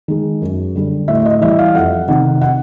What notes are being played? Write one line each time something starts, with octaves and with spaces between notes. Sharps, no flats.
D#3 G#3
F#2
D3 G3
A2 E5
E5
D#5
E3 G3 E5
F5
F2 F#5
C3 D#3 F#5
F#5